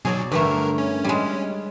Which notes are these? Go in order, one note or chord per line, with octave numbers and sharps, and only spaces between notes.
B2 F#3 G#4 C#5 D5
G2 D3 G3 A3 A#4
C#4
G3 G#3